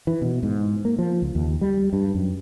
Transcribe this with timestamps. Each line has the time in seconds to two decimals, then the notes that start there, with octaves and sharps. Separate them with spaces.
0.07 E3
0.22 B2
0.43 G#2
0.85 A#3
0.99 F3
1.22 C#2
1.35 D#2
1.61 G3
1.93 G2
2.15 F#2